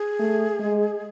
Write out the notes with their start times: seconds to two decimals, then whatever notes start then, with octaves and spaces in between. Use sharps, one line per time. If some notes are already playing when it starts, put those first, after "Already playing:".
Already playing: G#4
0.20 A3
0.59 G#3